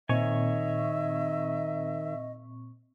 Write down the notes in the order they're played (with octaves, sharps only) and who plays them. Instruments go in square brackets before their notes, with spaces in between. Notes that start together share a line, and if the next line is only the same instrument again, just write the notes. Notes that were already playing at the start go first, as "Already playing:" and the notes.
[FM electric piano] A#2 C4 C#6 [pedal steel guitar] D#3 C#5 G#5 [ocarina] D#5 [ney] E5